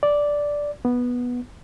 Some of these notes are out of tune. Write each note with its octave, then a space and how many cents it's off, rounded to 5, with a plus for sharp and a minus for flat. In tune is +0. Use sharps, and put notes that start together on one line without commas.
D5 -5
B3 -10